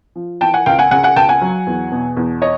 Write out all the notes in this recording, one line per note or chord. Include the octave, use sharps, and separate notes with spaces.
F3
E3 G5 A5
F#5 G#5
C#2 F5 G5
F#5 G#5
C#3 F#5 G#5
F#5 G#5
C#2 G5 A5
F#5 G#5
F#3
E2
B2
E2
C#5 D#5